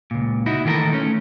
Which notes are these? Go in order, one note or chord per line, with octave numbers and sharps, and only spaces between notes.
C#2 A#2
D#4 E4 F#4
D#3 E3 A3 G4 A4 A#4
A3 C#4